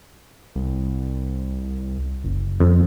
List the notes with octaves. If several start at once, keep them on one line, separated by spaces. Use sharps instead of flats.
C2
F#1
F2